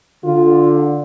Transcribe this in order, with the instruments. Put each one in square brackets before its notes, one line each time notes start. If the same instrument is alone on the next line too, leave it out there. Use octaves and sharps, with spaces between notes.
[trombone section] D3 [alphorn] F4